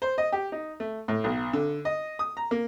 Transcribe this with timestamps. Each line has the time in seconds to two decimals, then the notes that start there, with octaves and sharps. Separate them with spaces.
0.02 C5
0.18 D#5
0.32 G4
0.52 D#4
0.80 A3
1.08 A2
1.24 B1
1.53 D3
1.85 D#5
2.19 D#6
2.37 A#5
2.51 A#3